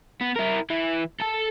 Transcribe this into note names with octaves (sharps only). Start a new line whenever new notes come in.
B3
E4 A#4
E3 E4
A4 A5